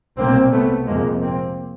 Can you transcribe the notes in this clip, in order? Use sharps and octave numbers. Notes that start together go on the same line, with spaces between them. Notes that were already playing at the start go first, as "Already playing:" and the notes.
C2 B2 A#3 C4
A3 B3
F2 C3 G#3 A#3
A#3 C4